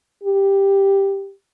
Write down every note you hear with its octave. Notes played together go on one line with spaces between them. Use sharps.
G4